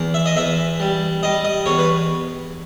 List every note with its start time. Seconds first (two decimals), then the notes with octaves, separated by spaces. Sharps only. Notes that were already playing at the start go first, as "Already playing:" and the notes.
Already playing: E2
0.14 E5
0.26 D#5
0.36 E2 E5
0.80 G3
1.23 G3 D#5
1.45 D#5
1.66 E2 C#5
1.79 B4